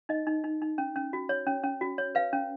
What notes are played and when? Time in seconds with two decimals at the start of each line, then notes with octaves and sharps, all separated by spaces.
0.09 D#4 D#5
0.27 D#4
0.44 D#4
0.62 D#4
0.78 C#4
0.96 C#4
1.13 F#4
1.29 C#5
1.47 C#4
1.63 C#4
1.81 F#4
1.98 C#5
2.15 B4 F5
2.33 C#4